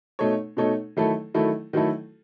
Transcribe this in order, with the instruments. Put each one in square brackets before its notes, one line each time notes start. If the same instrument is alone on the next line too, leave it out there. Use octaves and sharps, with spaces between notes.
[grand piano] B2 A3 D#4 A4 C#5
B2 A3 D#4 A4 C#5
D#3 F#3 A3 E4 A4
D#3 F#3 A3 E4 A4
D#3 F#3 A3 E4 A4